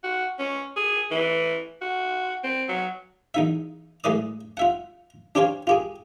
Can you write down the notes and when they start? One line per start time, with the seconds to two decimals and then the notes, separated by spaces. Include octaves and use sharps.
0.04 F#4
0.39 C#4
0.77 G#4
1.11 E3
1.81 F#4
2.44 C4
2.69 F#3
3.34 E2 D#4 E5
4.04 A2 G#3 B4 D5 D#6
4.57 F4 E5 F#5
5.35 D4 G4 C5 C#5 F5 G#5
5.67 F4 G4 G#4